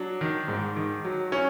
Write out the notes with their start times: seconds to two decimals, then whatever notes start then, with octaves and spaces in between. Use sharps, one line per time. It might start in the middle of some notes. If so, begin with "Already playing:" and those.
Already playing: F#3 D4
0.21 D#3
0.48 G#2
0.76 D#3
1.05 F#3
1.32 C#4